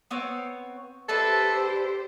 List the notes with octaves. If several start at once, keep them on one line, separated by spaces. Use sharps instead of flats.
B3 C4 C#5
D4 G4 A4 B4 C5 E5